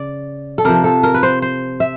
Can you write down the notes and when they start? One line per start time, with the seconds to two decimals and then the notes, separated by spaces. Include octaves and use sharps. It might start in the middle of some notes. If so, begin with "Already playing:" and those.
Already playing: C#3 D5
0.58 A4
0.65 C3 F3 A#4
0.84 A4
1.03 A#4
1.14 B4
1.23 C5
1.42 C5
1.80 E5